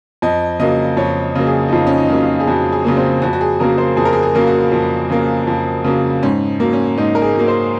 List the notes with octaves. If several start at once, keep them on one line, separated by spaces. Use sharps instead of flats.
F2 D#5
C#3 F#3 A#3 D#5
F2 C#5
C#3 F#3 A#3
G#4
D#4
F2 F4
C#4
D#4
C#3 F#3 A#3
F4
G#4
F2 F#4
G#4
C#3 F#3 A#3
C4
F2 F#4
F#4
G#4
C#3 F#3 A#3 A#4
C5
F2 G#4
A#4
G#4
G#4
C#3 F#3 A#3
F#4
F2
C#3 F#3 A#3
F2
C#3 F#3 A#3
G#2 C#4
F#3 A#3
C#4
G#2 D#4
A#4
G#4
F#3 A#3
C5